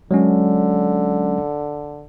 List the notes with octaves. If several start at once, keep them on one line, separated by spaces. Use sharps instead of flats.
D3 F#3 G#3 C#4